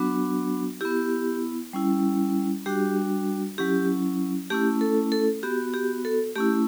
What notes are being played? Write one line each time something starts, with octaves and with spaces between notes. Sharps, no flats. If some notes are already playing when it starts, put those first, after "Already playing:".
Already playing: F#3 B3 D4 F#4
B3 E4 G4
G3 C#4 E4
G3 D4 F#4 G4
F#3 C#4 E4 G4
A3 C#4 E4 G4
A4
A4
B3 F#4 G4
G4
A4
A3 C#4 E4 G4